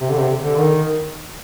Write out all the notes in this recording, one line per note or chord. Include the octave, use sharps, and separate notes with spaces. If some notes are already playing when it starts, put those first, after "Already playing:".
C3
D3
C3
D3
D#3